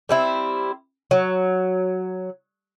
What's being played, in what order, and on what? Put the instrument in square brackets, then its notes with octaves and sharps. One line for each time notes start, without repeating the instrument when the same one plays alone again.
[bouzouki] G3 C4 E4
F#3